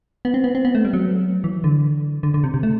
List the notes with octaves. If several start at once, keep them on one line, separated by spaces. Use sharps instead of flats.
B3
C4
B3
C4
B3
A3
G3
F#3
E3
D3
D3
D3
C3
C3
A3